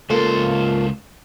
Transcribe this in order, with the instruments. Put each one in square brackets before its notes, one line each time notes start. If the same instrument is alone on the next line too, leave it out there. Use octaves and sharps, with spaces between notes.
[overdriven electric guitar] C#2 C5 [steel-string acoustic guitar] A#3 F4 A4